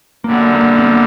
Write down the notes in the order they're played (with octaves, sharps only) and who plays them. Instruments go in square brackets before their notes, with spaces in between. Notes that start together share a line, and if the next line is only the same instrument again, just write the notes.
[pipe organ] F#2 D3 G3 [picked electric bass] A#3
[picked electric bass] A#3
B3
A#3